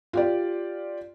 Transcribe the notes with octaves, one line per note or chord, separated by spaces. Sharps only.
F4 G4 D5